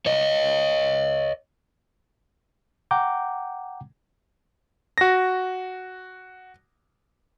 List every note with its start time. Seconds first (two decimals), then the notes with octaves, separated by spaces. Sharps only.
0.06 C#5 D#5
2.91 F#5 G5 A#5 D6 G6
4.98 F#4 A#6